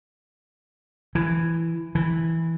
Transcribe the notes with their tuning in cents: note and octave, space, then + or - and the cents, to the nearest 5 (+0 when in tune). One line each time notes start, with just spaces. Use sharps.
E3 +10
E3 -5